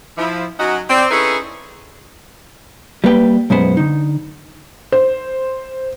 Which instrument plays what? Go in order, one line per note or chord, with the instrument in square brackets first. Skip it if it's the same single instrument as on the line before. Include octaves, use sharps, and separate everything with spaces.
[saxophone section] F3 E4
F#3 C#4 D#4 F#4
C4 D5
C#4 D#4 E4 G#4 A4 B4
[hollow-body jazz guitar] G3 A#3 B4 G5
B1 F#2 G#3 B3 C5
D3 D#4
[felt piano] C5